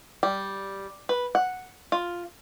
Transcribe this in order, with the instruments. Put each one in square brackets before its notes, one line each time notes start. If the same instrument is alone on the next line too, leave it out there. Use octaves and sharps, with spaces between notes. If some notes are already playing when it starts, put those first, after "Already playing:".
[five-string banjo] G3
B4
F#5
F4